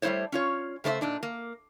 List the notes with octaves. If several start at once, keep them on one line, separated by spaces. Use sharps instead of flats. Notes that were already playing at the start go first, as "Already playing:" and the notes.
G3 A3 B3 E4 C5 C#5
C#4 F4 C#5
C#3 A3 C5 D5 E5
A#2 D4 D#4
A#3